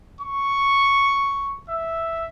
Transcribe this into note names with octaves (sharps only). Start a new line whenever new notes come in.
C#6
E5